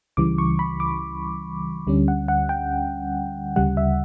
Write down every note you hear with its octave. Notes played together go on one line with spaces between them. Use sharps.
C#2 C#3 E3 G3 D6
C#6
B5
D6
D2 D3 G3 C#4
F#5
F#5
G5
D2 C#3 G3 F#5
E5